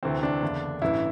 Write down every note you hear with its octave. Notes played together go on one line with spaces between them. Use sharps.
D2 C3 E3 C4
D4
F#1 E2 D3
A1 G2 E3 E4